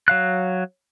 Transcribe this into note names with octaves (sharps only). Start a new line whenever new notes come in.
F#3 F5 F#6